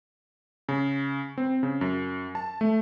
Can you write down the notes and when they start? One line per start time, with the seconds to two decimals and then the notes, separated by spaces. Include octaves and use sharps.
0.69 C#3
1.38 C4
1.63 C#3
1.81 F#2
2.35 A5
2.61 A3